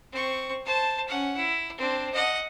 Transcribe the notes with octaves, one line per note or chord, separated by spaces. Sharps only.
C4 C#6
C5 A5
C#4 F#5
E4
C4 D4
D#5 F#5